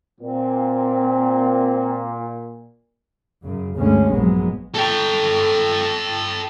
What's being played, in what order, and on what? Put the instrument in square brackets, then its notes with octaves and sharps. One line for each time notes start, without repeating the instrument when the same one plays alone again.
[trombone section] A#2 [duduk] C4
[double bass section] F#2 C#3
D2 G2 D3 G#3 C#4
A#1 F#3 G#3 B3
[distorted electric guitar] A4 G5